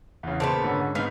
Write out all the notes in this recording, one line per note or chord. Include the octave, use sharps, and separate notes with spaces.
E2 C#3
A#2 C#3 B3 C5 A5
G#2 D3 C#4
G#2 B3 D#4 F5